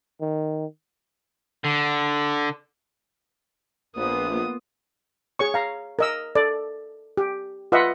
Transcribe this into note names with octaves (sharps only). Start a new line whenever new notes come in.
D#3
D3
A#1 A#3 B3 F4 D#6
G#4 C#5 C#6
F5 A#5
A#4 D#5 E6
A4 D5
G4
F4 B4 D#5 E5 F#5